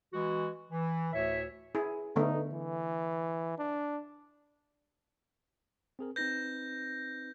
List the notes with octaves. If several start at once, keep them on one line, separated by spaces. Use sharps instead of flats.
E3 G#3 F#4
E3
D2 A2 C#5 E5
E4 G#4
D3 A3 B3 D#4
E3
D4
C4 G#4 A#4
C4 D#4 B4 G6 A#6